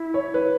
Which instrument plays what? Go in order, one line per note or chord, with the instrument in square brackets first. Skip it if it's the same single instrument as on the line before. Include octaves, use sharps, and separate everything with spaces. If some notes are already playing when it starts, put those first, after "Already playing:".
Already playing: [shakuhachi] E4
[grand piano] C#5
B4